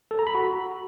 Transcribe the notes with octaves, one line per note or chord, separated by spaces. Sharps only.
A4
A#5
B5
F#4